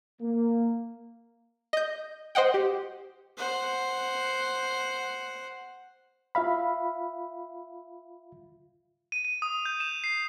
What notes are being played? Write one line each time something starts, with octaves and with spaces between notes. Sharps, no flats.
A#3
D#5 G6
C5 D#5 F#5 G5
G4
C5 F#5
F4 E5 F5 B5
D#7
D#7
D#6
G6
E7
C7